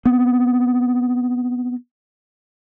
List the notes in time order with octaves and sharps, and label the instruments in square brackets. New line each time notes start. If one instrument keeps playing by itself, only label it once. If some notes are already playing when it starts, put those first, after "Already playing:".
[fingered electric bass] B3 C4